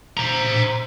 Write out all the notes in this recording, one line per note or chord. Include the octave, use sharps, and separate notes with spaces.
C5 A#5